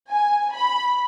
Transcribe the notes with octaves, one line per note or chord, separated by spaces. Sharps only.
G#5
B5